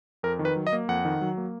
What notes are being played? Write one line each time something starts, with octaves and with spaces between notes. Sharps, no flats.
F2 A#4
D#3
B4
F#3
D#5
A#3
F2 F#5
D#3
F#3
A#3